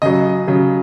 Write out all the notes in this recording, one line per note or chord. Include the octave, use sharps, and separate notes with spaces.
C#3 F#3 D#5
C#3 F#3